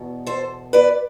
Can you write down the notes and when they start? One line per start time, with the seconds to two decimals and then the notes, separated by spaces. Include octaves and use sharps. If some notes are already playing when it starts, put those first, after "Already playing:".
Already playing: E2 B2
0.27 A4 C5
0.73 B4 D5